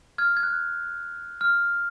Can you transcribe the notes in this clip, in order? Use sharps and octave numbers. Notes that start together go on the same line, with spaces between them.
F6 G#6
G#6
F#6
F6